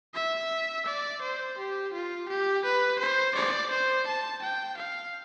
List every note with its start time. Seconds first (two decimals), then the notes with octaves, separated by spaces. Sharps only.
0.14 E5
0.86 D5
1.21 C5
1.58 G4
1.93 F4
2.29 G4
2.65 B4
2.99 C5
3.35 D5
3.70 C5
4.07 A5
4.42 G5
4.77 F5